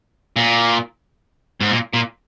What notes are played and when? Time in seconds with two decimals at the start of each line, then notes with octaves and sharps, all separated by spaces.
0.36 A#2
1.61 G#2
1.71 A#2
1.93 A#2